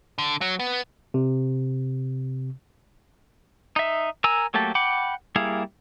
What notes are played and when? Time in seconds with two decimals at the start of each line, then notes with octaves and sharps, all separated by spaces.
0.18 D3
0.41 F#3
0.60 B3
1.14 C3
3.76 D#4 E5
4.24 A#4 G#5 A#5 E6
4.54 F#3 A3 A#3 G4 A4
4.75 F#5 G5 B5 D6
5.36 G3 A#3 E4 G#4 F5